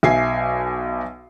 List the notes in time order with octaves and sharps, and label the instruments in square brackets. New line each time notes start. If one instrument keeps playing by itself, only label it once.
[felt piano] B1 E5 G#5 C7